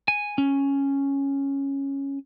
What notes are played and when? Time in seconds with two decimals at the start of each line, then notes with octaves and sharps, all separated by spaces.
0.08 G#5
0.38 C#4